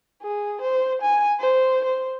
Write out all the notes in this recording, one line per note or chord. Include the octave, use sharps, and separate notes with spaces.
G#4
C5
G#5
C5
C5